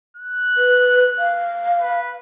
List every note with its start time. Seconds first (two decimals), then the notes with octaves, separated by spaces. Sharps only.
0.17 F#6
0.57 B4
1.19 F5
1.80 B4